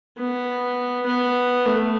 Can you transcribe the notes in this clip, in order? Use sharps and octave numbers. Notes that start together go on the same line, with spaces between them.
B3
B3
A3